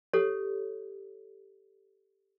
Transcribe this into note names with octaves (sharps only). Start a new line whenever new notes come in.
G4 A4 C#5